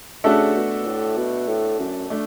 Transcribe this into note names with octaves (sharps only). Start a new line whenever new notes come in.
C#3 A3 D4 F#4 A4 E5
B2
A2
B2
A2
F#2
A3 D4